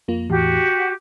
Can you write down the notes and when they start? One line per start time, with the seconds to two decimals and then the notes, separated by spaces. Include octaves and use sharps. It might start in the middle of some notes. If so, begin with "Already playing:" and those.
0.08 F2 A#3 F4
0.30 E2 A2 E3 F#4 G4
0.69 D6